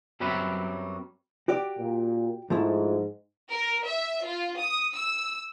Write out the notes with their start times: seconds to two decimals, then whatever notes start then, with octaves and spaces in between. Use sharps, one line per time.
0.20 F#2 F#3 G3 C4 B4 E5
1.48 F#4 G4 D5
1.79 A#2
2.50 G#2 F3 A3 E4
3.50 A#4
3.86 E5
4.25 F4
4.58 D#6
4.95 E6